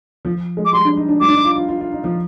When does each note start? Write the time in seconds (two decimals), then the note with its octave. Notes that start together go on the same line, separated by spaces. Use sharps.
0.25 F3
0.57 G#3
0.65 D6
0.73 G3 C6
0.85 D4
0.97 D#4
1.08 D4
1.20 G3 D6
1.28 D4
1.33 D#4
1.45 F4
1.56 F4
1.69 F4
1.81 F4
1.92 D#4
2.04 F3